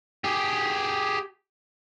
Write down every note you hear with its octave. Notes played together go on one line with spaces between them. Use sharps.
G4 G#4